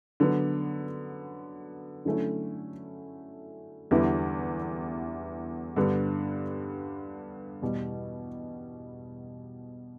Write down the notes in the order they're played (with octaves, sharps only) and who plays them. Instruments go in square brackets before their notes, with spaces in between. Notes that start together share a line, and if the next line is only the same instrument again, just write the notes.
[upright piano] D3 F#3 B3
D3 F#3 A3 C#4 E4
E2 D3 G3 B3 E4
G2 D3 G3 B3
E2 B2 G3